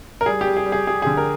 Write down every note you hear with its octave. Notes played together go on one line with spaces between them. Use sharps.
A#4
G3 G#4
G4
G3
G#4
G3
G#4
G3 G#4
D3 G#4
A#4